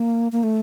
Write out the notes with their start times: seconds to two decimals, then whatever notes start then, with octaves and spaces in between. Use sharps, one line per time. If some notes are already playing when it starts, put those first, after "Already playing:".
Already playing: A#3
0.32 A#3
0.43 A3